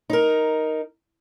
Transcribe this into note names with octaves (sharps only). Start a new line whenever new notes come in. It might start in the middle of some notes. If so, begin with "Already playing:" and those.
D#4 A#4